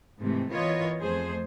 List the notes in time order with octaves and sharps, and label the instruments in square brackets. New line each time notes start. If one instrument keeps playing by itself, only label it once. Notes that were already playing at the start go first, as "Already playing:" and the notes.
[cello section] G#2 C3 E3 A3
E3 B3 F4 A#4 C#5 D#5
F2 A3 G#4 C5